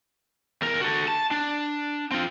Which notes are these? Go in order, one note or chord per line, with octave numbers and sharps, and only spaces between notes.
E2 A#4
F#4 A4
A5
D4
C4 F4